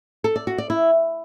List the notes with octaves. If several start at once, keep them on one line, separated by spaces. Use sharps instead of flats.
A4
D5
F#4
D5
E4